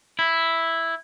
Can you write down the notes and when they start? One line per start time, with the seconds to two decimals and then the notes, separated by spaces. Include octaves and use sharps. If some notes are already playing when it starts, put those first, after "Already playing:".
0.19 E4